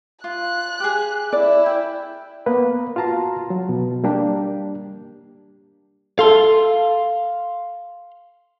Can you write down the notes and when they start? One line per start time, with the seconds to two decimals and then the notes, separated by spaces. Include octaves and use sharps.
0.24 F4 F#6
0.80 G4 G#4
1.33 E4 D5
1.66 G5
2.46 A#3 B3 B4
2.96 F4 F#4 A5 A#5 C6
3.50 F#3
3.69 B2
4.04 G3 A#3 D4 G4
6.19 A4 F5 C6